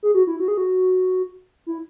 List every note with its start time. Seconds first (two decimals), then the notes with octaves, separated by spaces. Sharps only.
0.03 G#4
0.14 F#4
0.27 E4
0.40 F#4
0.48 G#4
0.57 F#4
1.66 E4